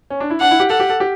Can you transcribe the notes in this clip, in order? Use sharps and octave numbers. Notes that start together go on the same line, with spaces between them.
C#4
D4
E4
D4 F#5
E4
G4
A4 F#5
G4
A4
G4